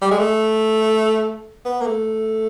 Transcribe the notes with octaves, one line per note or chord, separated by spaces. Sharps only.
G3
G#3
A3
B3
A#3
A3